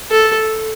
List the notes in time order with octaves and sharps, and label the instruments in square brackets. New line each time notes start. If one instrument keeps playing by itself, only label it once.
[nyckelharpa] A4